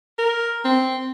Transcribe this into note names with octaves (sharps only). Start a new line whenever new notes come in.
A#4
C4